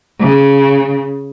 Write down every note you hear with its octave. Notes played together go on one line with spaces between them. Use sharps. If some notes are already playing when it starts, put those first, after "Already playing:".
C#3